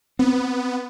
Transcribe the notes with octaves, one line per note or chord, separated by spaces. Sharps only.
B3 C4